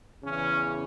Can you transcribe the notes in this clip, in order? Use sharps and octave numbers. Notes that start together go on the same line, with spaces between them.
E2 C#3 E3 C#4